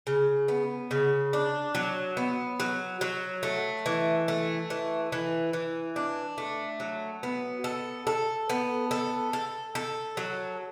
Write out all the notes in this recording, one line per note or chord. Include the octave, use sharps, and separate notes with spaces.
C#3
B3
C#3
D4
F#3
B3
F#3
F#3
A3
E3
A3
E3
E3
E3
D4
A3
F#3
B3
A4
A4
B3
A4
A4
A4
F#3